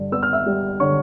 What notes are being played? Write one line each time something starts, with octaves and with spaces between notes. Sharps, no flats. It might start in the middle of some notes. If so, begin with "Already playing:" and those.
Already playing: G2 D3 D5
B3 E6
F6
E5 E6
G3
D3 C#5 C#6